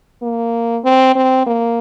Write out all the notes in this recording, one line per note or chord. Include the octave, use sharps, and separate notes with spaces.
A#3
C4
C4
A#3